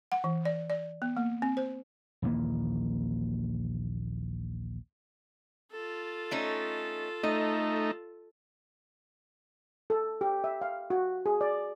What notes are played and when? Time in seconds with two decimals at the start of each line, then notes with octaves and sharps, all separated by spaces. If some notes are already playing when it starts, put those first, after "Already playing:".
0.12 F#5
0.24 E3
0.45 D5
0.70 D5
1.02 B3
1.17 A#3
1.42 C4
1.57 C5
2.22 A#1 D#2 E3 A#3
5.71 F4 A4
6.31 A3 C#4 D#4
7.23 A3 D#4 D#5
9.90 A4
10.21 G4
10.44 E5
10.61 F5
10.90 F#4
11.26 G#4
11.41 D5